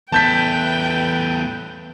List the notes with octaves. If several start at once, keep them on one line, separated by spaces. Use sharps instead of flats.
E2 A3 B4 G5 A5 G6 B6